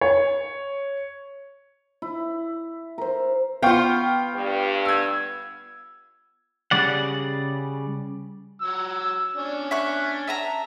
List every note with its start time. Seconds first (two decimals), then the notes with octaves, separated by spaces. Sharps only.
0.01 C#5
2.02 E4
2.98 A#4 C5
3.62 B3 F4 F5 G5 C#6
4.34 G2
4.85 E6 G#6
6.71 C#3 G3 D5 F#5
8.61 F#3 E6
9.36 C#4 D4
9.71 E5 C#6 F#6
10.27 E5 A5 A#5